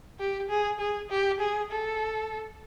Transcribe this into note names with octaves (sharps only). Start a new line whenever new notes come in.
G4
G#4
G#4
G4
G#4
A4